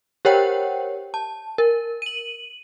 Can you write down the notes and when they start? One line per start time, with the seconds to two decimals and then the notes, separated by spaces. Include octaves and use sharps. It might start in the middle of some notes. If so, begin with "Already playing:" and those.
0.25 G4 A#4 C5 C#5 F#5 G5
1.14 A5
1.58 A#4
2.02 D#7 F#7